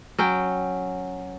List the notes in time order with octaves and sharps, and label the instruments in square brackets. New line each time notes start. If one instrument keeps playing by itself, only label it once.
[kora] F#3 C#4 G5